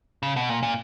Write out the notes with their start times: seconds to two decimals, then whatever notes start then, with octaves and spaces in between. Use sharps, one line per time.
0.23 C#3
0.36 B2
0.49 A#2
0.63 A#2